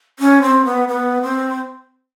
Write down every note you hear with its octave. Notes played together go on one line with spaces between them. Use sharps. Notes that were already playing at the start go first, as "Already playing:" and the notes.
C#4
C4
B3
B3
C4